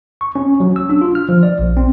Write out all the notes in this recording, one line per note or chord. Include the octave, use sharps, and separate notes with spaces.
C#6
C#4
F#3
E6
D4
F4
F6
F3
D5
A#1
C4